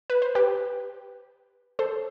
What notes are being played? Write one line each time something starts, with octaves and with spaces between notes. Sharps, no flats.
B4
C5
G4 B4
A4 C5